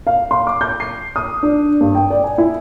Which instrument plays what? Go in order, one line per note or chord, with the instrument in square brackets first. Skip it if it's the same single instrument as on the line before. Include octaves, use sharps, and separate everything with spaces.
[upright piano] F5
C6
D6
G6
C7
D#6
D4
G2
G5
D5
G#5
E4